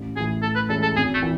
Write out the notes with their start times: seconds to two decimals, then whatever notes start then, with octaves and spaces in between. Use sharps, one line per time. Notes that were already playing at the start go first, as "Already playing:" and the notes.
Already playing: A1
0.16 A2 E3 G#4
0.42 A2 A4
0.55 B4
0.69 E3 G#3 C#4 E4 A4
0.83 A4
0.96 G#1 G#4
1.14 A3
1.22 E3